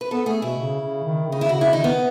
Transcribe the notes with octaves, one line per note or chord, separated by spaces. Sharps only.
B4
B3 A4
A3 G#4
B2 E4
C#3
C#3
D#3
C#3
D#4
E4
C#3 F#4
E4
D#3 D#4
B3